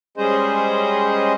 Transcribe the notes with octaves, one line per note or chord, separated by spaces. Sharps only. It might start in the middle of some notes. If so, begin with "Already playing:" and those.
G3 G#3 C#4 G#4 C5 D#5